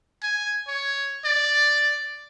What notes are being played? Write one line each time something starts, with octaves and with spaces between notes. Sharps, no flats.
G#5
C#5
D5